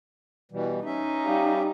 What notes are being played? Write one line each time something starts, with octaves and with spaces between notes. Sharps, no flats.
B2 E3 G3
C#4 D#4 E5
G3 F5